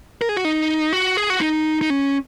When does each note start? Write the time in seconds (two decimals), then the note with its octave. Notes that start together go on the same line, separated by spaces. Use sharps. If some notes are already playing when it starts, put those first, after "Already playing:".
0.22 A#4
0.29 G#4
0.37 F#4
0.45 D#4
0.93 F#4
1.17 G#4
1.30 F#4
1.41 D#4
1.81 D#4
1.90 C#4